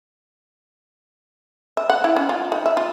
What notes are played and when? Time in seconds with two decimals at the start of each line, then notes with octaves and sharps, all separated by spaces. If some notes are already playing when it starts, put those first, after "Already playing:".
1.77 E5
1.90 F#5
2.04 E4
2.16 C#4
2.29 F4
2.52 D#4
2.66 E5
2.77 F4